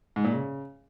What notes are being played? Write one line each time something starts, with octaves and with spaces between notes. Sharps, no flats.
G#2
A#2
C#3